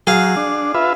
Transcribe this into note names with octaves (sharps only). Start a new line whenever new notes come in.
F#3 G#4 F5
D4
F4 B4 E5